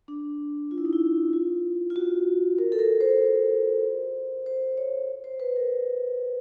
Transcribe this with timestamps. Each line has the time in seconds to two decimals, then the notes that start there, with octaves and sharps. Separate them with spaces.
0.08 D4
0.71 F4
0.78 E4
0.85 D#4
0.93 E4
1.33 F4
1.90 F4
1.96 F#4
2.58 A#4
2.72 A4
2.79 A#4
3.01 C5
4.46 C5
4.77 C#5
5.24 C5
5.40 B4
5.56 A#4